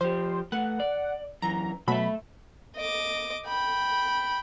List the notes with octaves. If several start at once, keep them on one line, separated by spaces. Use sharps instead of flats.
F3 G4 C5
A3 B4 F#5
D5
F#2 E3 A#5
B2 F#3 A3 E5 B5
D#5 D6
G5 B5